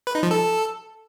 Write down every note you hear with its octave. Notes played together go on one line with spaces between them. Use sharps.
B4
D#4
F3
A4